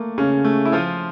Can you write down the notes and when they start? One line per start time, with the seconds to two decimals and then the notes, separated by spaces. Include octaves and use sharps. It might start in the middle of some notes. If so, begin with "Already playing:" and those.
Already playing: A3 A#3
0.18 C#3 C#4
0.44 A3
0.65 E4
0.72 F3 F4